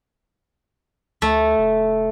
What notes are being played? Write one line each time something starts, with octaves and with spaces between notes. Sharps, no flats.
D2 A3
F1